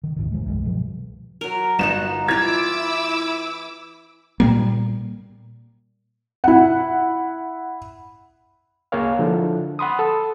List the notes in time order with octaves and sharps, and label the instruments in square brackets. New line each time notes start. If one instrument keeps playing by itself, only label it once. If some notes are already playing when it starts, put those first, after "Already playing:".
[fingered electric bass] D#3
D#2 G#2 D#3
E1 E3 G#3
C2 G2 D#3 G#3
B2 F3 F#3
[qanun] F#3 A#4
[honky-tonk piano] G1 E7 [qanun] B3 D#4 F#4
[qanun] E3 F4 [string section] E4 D6 E6 [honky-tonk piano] G#6
[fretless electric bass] A#2 G3 A#3
[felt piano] E4 F#5
[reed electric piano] C2 A#3 G#4 A#4 C#5 F5
D3 F3 D4 E4 A4
F#5 B5 C6 D#6
A4